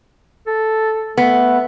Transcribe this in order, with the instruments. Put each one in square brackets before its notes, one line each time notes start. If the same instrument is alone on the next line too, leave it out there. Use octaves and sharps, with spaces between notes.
[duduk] A4
[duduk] A3 [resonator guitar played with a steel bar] B3